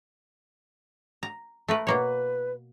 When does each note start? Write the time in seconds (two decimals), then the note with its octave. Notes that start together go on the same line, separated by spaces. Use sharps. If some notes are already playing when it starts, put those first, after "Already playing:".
1.23 A#5
1.68 A3 A#4 B4
1.87 B2 A#3 B4 C#5